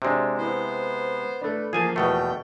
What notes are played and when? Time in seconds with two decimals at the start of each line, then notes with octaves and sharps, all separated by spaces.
0.02 C3 G#3 D4 F#4
0.37 B3 E4 C5
1.41 A3 D4 B4
1.73 F3 A#3 G#4 F5 G#5 A5
1.96 E2 B2 A3 G5